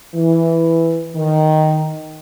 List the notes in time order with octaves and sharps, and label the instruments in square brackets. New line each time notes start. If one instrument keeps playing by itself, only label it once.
[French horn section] E3
D#3